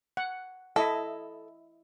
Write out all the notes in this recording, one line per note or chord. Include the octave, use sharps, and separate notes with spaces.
F#5
E4 A4 D#5 E5